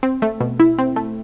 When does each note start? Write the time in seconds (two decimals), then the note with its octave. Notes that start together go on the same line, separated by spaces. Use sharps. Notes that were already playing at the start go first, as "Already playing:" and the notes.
0.03 C4
0.22 A3
0.40 B2
0.60 E4
0.78 C4
0.96 A3